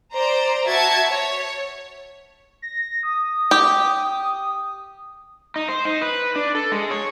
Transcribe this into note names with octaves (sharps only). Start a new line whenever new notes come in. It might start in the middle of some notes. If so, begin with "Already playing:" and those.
C5 D5 A#5
F#4 E5 A5 G#6
C#5
A#6
D#6
G4
D#4
C5
D#4
B4
D4
A4
G#3
C#5